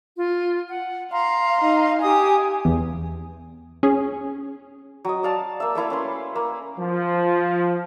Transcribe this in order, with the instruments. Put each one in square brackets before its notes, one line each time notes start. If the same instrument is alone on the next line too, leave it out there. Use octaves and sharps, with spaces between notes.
[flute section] F4
F#5
[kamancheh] F5 [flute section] A#5 C6
[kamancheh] D#4 F5
[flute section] G4 D#6 [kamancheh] G#5
[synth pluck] E2
C#4 G#4
[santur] F#3 D#5
D5 F5 A5
A#3 E5
A3 A#3 E4 F5
C#4 B4 C6
A#3
[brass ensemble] F3